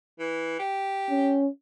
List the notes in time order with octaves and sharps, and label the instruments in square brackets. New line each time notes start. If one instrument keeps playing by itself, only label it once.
[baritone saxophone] E3
G4
[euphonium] C#4